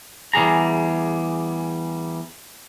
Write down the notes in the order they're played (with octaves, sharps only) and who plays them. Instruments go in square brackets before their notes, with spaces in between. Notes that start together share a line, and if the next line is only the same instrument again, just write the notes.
[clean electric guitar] E2 G3 G#4 A#5